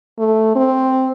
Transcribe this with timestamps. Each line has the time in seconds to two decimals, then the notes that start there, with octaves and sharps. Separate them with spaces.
0.19 A3
0.56 C4